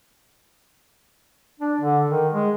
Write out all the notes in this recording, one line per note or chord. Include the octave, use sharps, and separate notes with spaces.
D4
D3
D#3
G#3